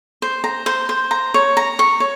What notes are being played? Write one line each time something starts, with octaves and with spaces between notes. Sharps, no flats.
C5
A#5
C5
C5
A#5
C#5
A#5
C#6
C#5